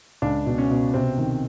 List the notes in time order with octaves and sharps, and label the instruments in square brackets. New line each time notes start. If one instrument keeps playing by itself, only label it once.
[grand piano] C#2 D4
B2
C#4
B2
C3 C4
D#3